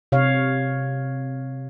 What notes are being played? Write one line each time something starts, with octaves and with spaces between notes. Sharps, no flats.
C3 C#5 F5